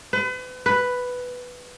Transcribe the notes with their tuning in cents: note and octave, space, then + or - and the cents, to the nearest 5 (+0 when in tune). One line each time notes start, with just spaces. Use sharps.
B4 +40
B4 +5